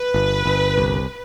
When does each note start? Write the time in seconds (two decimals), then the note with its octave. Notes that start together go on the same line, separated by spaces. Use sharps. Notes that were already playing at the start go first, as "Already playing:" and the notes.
Already playing: B4
0.14 G1
0.45 G1
0.77 C2